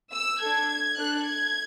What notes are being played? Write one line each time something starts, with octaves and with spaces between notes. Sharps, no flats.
E6
D4 A4 G#6
D4 A4 F#6
G#6